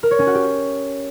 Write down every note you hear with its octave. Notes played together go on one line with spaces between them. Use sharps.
A#4
C#5
C#4
F#4
G4